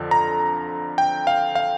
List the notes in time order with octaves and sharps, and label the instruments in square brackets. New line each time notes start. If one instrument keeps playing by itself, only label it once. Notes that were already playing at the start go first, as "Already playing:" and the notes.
Already playing: [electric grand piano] F2 D3 F3
A#5
G5
F5
F5